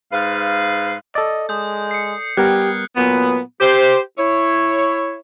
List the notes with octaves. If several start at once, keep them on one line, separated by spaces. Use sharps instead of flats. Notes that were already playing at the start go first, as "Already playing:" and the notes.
G#2 B4 F5
A4 D5 D#5
G#3 D#6 G6
C7 C#7
G3 B3 G4 A#4 G5 F6 F#6 G#6
A#2 F#3 B3
G4 C5
E4 C#5